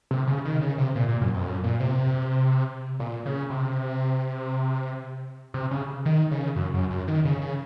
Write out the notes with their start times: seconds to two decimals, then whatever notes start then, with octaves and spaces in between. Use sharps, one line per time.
0.11 C3
0.27 C#3
0.45 D#3
0.61 C#3
0.78 C3
0.95 A#2
1.08 A#2
1.21 F#2
1.34 F2
1.46 F#2
1.64 A#2
1.80 C3
3.00 A#2
3.26 C#3
3.50 C3
5.54 C3
5.71 C#3
6.05 D#3
6.31 C#3
6.56 F#2
6.74 F#2
6.91 F#2
7.08 D#3
7.25 C#3
7.41 C#3